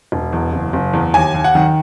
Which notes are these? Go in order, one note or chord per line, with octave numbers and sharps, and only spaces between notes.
E1
E2
F#1
F#1
E2
D#2 G#5
D#2
F#5
D#3